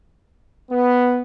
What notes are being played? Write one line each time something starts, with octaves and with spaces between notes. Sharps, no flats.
B3